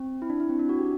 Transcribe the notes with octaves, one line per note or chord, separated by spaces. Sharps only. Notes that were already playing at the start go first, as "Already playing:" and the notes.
Already playing: C4
E4
D4
E4
C4
D4
F#4
G4